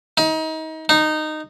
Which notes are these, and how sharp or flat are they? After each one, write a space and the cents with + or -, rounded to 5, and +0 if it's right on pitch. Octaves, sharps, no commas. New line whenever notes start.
D#4 +30
D#4 -15